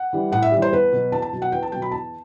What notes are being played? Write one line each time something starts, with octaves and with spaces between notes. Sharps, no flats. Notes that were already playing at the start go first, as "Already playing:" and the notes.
Already playing: F#5
E3 G3
A2 F#5
E5
E3 G3
C5
E2 B4
B2 F#3
E2 A5
A5
B2 F#3
F#5
E2 G5
A5
B2 F#3 G5
B5
E2 A5